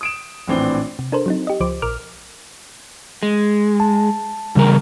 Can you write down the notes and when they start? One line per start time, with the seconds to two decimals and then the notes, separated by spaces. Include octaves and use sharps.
0.01 D#6 D7 E7
0.48 A#1 A2 E3 C4 D4 G7
0.99 C3
1.12 D4 A4 A#4 C5
1.26 F#3 C4 D#4
1.47 G4 D#5
1.60 C#2 F3 C5 D6
1.82 A#1 A#4 D6 F6
3.23 G#3
3.80 A5
4.55 E2 G2 C#3 G3 A#4